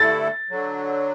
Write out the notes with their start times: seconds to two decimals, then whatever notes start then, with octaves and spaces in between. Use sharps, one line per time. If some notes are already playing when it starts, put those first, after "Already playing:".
Already playing: G2 D3 A3 E4 A4 A6
0.50 D3 F#3